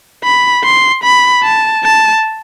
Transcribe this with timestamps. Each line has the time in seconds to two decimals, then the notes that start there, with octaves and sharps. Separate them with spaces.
0.23 B5
0.64 C6
1.03 B5
1.43 A5
1.84 A5